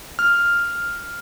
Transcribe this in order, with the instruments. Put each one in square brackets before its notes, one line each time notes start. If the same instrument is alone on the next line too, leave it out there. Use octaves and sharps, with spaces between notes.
[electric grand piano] F6